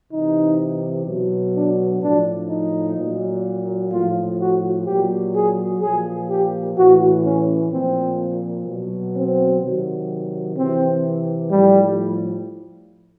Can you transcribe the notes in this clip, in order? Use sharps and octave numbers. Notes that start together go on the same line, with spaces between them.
C3 E3 D#4
B2 F#3
D4
A2 F3 D4
D#4
A#2 F#3
A2 F3 F4
F#4
A#2 F#3 G4
G#4
A#2 F3 G#4
G4
A2 E3 F#4
C#4
A#2 F3 C4
B2 F#3
C4
C3 D#3 F#3
C3 E3 C4
A2 F3 G3